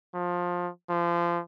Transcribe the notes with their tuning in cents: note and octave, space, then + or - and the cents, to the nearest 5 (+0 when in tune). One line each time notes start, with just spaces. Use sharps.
F3 +20
F3 -25